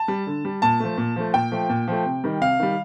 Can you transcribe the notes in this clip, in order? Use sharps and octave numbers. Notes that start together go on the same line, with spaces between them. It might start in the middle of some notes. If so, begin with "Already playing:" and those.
Already playing: A5
G3
D3
G3
A#2 A5
F3 A3
A#2
F3 A3
A#2 G5
F3 A3
A#2
F3 A3
C3
D#3 G3
C3 F5
D#3 G3